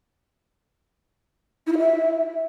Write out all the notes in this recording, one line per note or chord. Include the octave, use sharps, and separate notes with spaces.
E4
F4
E5